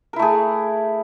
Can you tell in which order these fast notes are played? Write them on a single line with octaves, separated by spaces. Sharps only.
A#4 E4 A3 G#4